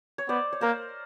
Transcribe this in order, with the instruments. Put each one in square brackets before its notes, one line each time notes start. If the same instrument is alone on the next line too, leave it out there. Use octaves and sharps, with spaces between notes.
[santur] C#5
[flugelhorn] B3 [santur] C5 D5
[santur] C#5
[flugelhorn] A#3 [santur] A#4 C5